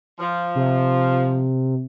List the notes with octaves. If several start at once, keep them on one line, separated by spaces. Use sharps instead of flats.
F3
C3